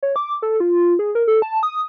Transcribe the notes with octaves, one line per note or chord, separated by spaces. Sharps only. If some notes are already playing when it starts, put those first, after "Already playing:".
C#5
D6
A4
F4
G#4
A#4
A4
A5
D#6